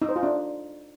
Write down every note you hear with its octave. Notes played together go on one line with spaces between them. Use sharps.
D#4
C5
F4
D4